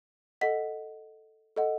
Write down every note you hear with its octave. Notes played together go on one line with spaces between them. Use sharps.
A4 D#5 F#5 B6
A4 D#5 F#5